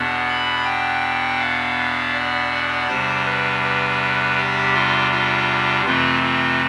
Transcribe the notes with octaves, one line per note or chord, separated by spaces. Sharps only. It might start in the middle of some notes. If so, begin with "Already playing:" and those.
Already playing: E2 B2 B3 D4
B5
G5
F5
D5
E2 C3 G3 D4 C5
B4
B4
G4
F4
F4
F2 C3 E3 A3 C4 F4
F4